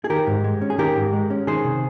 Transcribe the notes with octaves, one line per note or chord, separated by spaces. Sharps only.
G#4
D#3 G4 A#4
G#2
G#3
C#4
G#4
D#3 G4 A#4
G#2
G#3
C#4
D#3 G#4 C5
C3